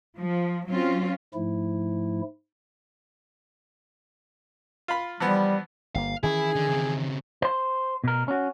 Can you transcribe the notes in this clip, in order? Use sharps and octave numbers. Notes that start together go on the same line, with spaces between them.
F3
F#3 C4 C#4 F4
G#2 F3 A3 E4
F4 F5 B5
E3 F3 G3 B3
G1 A#3 F5
D#3 E3 C#4 E4 G#4
D3
C#3 C4
C5 C6
B2 A#4
C#4 F#4